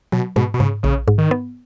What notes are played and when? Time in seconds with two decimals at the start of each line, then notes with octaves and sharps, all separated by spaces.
0.12 B2 F#3
0.36 G#2 B2
0.54 B2
0.60 G#2 C#3
0.83 A#1 C#3
1.08 G#2
1.18 D#3
1.31 B3